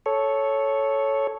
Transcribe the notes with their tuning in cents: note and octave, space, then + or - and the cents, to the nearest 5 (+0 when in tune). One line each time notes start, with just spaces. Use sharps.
A4 -10 C#5 +0